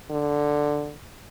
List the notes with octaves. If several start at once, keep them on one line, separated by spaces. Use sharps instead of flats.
D3